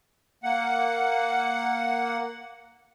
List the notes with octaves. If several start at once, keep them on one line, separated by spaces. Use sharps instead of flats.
A#3 F#5